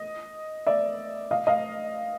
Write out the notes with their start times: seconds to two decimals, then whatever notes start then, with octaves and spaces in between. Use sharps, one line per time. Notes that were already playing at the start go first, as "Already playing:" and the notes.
Already playing: D#5
0.67 D5 E5
1.31 D#5 F5
1.47 D#5 F5